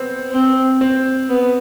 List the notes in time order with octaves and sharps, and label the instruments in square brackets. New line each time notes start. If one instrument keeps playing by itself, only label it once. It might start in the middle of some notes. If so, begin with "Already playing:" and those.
Already playing: [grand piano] B3 C4
[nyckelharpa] C4
[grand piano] C4
[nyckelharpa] B3